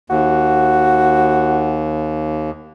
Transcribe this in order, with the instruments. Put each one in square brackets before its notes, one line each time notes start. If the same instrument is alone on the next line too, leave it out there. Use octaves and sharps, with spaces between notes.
[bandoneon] D#2 [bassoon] F#4